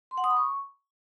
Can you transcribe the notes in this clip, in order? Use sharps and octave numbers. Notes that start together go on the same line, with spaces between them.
C6
F#5
D#6
B5
C#6